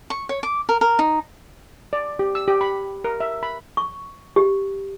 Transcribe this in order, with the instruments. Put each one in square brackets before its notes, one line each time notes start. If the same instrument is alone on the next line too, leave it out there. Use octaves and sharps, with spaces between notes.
[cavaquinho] C#6
C#5
D6
A#4
A#4
D#4
[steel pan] D5
G4
E6
G4
B5
A#4
E5
B5
[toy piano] C#6
G4